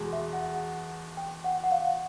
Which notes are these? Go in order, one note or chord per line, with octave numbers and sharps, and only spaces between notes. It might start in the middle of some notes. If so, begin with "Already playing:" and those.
Already playing: E2 B2 G#3
E5
F#5
G5
F#5
F#5
F5